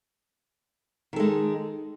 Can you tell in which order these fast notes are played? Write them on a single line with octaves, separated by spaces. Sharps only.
D#3 A4 G#3